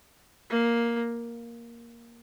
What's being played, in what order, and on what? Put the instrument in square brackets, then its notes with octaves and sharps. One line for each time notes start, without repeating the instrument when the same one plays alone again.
[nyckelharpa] A#3